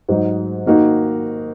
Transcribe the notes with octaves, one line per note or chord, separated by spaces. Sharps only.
G#2 F#3 D#4
D#3 A#3 D#4 F#4